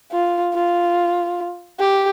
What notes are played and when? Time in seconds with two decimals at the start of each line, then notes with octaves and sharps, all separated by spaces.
0.12 F4
0.54 F4
1.79 G4